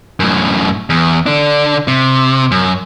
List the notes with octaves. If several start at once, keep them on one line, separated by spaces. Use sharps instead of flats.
F#2 A2
E2
D3 D4
C3
F#2